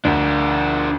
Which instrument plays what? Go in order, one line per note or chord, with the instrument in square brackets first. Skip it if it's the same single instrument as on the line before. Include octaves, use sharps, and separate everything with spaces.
[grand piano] D2 [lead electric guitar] D4 A#4